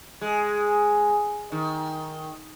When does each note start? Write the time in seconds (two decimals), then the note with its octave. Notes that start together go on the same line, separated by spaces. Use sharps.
0.21 G#3
1.52 D#3